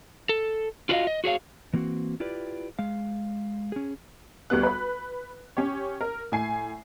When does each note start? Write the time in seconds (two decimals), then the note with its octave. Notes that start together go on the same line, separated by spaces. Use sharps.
0.29 A4
0.89 F4 F#4 B4 D5 D#5 F5
1.07 D#5
1.24 F#4 G#4 C#5 F5
1.73 E3 A#3 C4 F#4
2.20 E4 F4 G4 B4 D5
2.79 G#3 F5
3.72 C#4 G#4
4.50 D2 G3 B3 F#6
4.63 B4 B5
5.57 C#4 G4 C#5
6.01 A#4
6.32 A2 G#5 C7